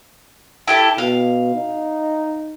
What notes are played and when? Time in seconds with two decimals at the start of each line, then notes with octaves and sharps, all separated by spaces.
0.68 E4 G4 A4
0.98 B2 F5
1.55 D#4